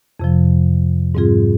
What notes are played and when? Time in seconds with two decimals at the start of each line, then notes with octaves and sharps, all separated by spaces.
0.20 F2 C3 F3
1.15 G#2 G3 C4 F4 G#4